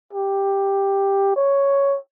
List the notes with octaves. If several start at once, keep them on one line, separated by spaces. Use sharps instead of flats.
G4
C#5